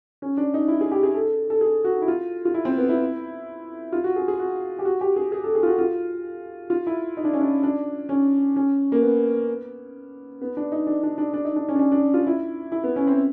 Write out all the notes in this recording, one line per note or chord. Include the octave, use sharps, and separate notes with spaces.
C#4
D4
D#4
E4
G#4
G4
G#4
A4
A4
G#4
F#4
E4
F4
F4
E4
C4
B3
E4
F4
F#4
G#4
G#4
F#4
G4
F#4
G4
G#4
G#4
A4
G#4
F4
F#4
F4
F4
E4
D#4
D4
C#4
D4
D4
C#4
C#4
A#3
B3
B3
D4
D#4
D4
D4
D4
D4
D#4
D4
C#4
D4
C#4
D4
F4
E4
E4
B3
C#4
C4